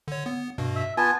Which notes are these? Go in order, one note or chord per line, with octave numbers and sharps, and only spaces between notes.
D3 C#5
B3
G2 B2
E5
B3 F4 G#5 A5